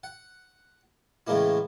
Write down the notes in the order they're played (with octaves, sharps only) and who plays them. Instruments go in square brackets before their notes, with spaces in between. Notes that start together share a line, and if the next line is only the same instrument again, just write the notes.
[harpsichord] F#5
A2 C#3 E3 G#3 A#3 E4